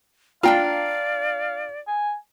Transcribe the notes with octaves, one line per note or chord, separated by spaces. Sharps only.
D4 F4 D5 F5 G5 A#5
G#5